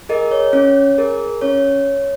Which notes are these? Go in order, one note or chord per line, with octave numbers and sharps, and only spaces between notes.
G#4 A#4 D#5
C#5
C#4 C#5
G#4 A#4
C#4 C#5